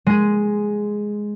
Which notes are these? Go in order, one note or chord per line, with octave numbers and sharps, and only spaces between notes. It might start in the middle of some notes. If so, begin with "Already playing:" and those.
G#3 G#4